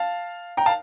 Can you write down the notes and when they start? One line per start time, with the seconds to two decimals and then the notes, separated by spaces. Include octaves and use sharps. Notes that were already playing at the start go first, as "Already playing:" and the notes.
Already playing: F5 A5
0.57 G5 A#5
0.66 F5 A5